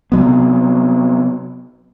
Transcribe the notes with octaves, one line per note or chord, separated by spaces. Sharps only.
C3 F#3 B3